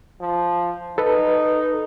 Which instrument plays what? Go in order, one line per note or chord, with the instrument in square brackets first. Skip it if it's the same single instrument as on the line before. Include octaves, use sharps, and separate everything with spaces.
[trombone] F3
[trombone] D#4 [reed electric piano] A4 B4